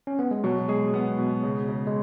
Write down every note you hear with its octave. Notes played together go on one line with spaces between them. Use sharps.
C#4
B3
G#3
B2 F#3
G#3 G#4
B3
B2
C#3
C#3
G#3